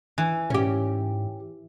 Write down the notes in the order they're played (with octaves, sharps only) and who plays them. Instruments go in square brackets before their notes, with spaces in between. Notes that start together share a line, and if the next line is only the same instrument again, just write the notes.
[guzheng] E3
[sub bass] G#2 [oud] C#4 G4